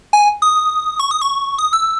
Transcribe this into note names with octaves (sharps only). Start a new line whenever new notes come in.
G#5
D#6
C#6
D#6
C#6
D#6
E6